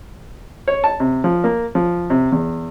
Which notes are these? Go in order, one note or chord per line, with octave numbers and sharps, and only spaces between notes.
C#5
A5
C3
F3
A#3
F3
C3
E2